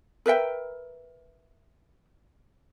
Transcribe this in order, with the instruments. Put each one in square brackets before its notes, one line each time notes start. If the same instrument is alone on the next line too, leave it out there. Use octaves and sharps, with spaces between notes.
[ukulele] A#4 B4 E5 G5